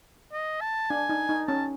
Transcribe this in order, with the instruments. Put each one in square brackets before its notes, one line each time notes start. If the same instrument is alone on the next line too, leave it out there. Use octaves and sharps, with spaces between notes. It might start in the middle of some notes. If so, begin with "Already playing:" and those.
[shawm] D#5
A5
[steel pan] D4 [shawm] G#5
[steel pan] D#4
D#4
[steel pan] C#4 [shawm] A5